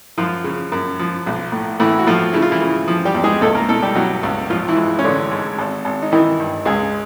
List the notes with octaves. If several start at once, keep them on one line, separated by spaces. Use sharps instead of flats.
F#2 F3 F4
C#3
F#2
F3
B1
A2
A2 E3 E4
F#4
A2 F3 F4
C#3 E4
F4
E3 E4
C#3
F3
G3 G4
E2
G#3 G#4
C#2 A3 A4
A#3 A#4
B2 A3 A4
G3 G4
B2 F#3 F#4
C#2
A1 F3 F4
E3 E4
G#2
C#4
A1 D3 D4
G#2
G#1
G#1
D#4
D#3 E3 E4
G2
C#2 G#3 G#4